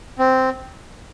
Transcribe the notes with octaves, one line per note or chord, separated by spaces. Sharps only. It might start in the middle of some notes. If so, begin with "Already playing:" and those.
C4